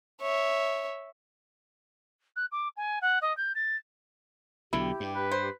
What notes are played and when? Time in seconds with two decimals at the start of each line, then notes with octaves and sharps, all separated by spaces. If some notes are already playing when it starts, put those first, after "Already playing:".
0.21 C#5 E5
2.36 F#6
2.52 D6
2.77 G#5
3.01 F#5
3.22 D#5
3.37 G6
3.55 A6
4.73 B1 B2 D3 E4 G4
5.00 G2
5.15 B4
5.32 C5